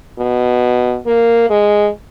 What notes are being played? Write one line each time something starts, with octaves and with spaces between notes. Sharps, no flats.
B2
A#3
G#3